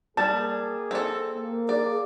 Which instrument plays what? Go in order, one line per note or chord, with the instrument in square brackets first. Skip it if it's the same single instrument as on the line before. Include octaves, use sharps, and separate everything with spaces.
[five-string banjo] G3 [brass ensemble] A#3 G#4 [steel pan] A5
[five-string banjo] C4 A4
[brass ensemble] A#3
[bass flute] G#4 [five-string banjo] D5